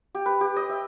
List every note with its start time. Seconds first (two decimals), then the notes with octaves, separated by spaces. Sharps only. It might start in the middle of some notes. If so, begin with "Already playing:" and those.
0.15 G4
0.26 B4
0.41 G4
0.56 D#5
0.69 E5